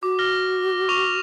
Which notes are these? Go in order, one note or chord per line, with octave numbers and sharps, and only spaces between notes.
F#4 D6
F6 A#6 G7
C#6 D6 F7